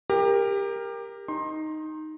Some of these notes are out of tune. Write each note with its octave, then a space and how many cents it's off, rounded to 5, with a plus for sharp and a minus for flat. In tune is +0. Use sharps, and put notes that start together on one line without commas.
G4 +25 A#4 +0
D#4 +0 C6 +25